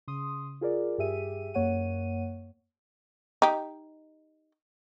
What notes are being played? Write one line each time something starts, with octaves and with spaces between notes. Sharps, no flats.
C#3 C6 D#6
F4 G#4 A#4 D5
G2 G4 G#4 E5 D#7
F#2 A#3 C#5 F#5 D#7
D#4 G4